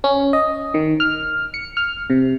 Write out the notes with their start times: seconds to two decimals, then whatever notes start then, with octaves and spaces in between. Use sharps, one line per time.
0.04 C#4
0.33 D#5
0.74 D#3
1.00 F6
1.54 C#7
1.77 F6
2.10 C3